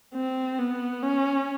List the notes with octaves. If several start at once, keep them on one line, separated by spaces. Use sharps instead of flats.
C4
B3
C#4